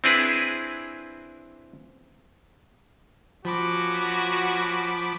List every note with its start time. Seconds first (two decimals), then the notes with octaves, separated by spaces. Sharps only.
0.04 C4 D4 E4 G#4 B4
3.45 F3 A#3 C#4 F#4 B5 D6